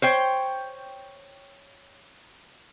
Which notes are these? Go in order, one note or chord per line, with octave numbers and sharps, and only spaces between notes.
C5 C#5 G5